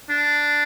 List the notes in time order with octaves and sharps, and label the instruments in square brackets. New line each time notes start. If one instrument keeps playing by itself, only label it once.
[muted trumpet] D4